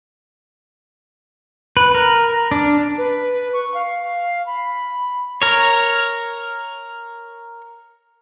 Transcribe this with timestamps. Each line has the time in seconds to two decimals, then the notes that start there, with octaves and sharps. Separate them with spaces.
1.77 B4
1.95 A#4
2.51 D4
2.98 B4
3.53 C#6
3.74 F5
4.46 B5
5.42 A#4 C#5